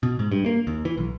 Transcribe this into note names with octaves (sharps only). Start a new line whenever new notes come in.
B2
G#2
G2
A#3
D#2
E3
B1